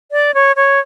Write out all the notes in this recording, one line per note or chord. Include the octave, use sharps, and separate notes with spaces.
D5
C#5
C#5